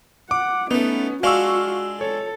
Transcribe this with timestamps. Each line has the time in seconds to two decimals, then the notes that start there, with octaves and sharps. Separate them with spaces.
0.31 F#5 D6
0.71 A3 B3 C#4 D#4
1.23 G#3 D4 F4 F#4 F5 C#6 E6
2.01 A4 C#5